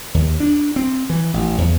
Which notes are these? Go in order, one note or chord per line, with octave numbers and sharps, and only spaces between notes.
D#2
D4
C4
E3
A1
E2